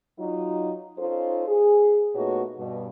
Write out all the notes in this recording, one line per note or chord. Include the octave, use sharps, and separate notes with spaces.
F#3 D#4 F4
C#4 D#4 F4 A4 C5
G#4
A#2 A3 B3 D#4 F#4 C#5
G2 B2